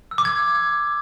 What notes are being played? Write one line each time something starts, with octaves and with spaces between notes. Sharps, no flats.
E6
D6
G#6